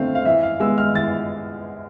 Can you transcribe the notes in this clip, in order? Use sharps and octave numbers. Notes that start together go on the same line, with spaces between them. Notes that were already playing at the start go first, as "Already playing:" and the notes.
Already playing: D3 A3 C4 F5
F5
E3 E5
F5
G#3 B3 E6
F6
E3 A6